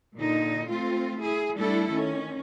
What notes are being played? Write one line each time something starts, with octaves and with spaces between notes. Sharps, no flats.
A#2 D3 D#4
A3 C4 F4
E4 G#4
G3 A3 D4 E4 A4
D#3 C#4